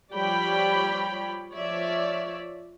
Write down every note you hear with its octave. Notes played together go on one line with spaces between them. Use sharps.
F3 G3 C#5 D5 G5 B5
F3 C#5 D5 E5